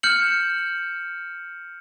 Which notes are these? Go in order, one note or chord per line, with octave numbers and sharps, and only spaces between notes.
F6 G6 C#7 E7 F#7